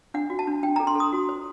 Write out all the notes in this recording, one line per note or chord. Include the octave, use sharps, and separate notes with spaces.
D4 F#5
F#4
A5
D4
D4 G5
A#5
A4
C6
A4 D#6
F#4
C5